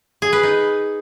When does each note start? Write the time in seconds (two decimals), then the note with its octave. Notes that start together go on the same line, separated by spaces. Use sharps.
0.22 G#4
0.33 B4
0.43 D#4